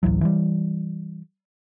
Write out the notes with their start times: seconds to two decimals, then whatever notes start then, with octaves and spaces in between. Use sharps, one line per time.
0.03 A1 D2 E3 F#3
0.21 E3 F3 G3